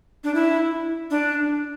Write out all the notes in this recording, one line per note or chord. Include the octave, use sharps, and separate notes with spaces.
D4
E4
D4